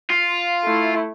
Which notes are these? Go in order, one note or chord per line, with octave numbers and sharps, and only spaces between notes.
F4
A3 E4